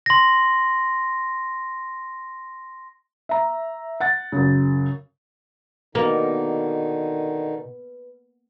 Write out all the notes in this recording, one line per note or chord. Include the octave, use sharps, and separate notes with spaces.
C6 A#6
E5 A#5
F#5 A6
F#2 C#3
B2 D3 D#3 A#3 D#4 B4